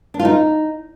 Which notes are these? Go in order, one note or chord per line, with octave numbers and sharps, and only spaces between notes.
D4
F4
D#4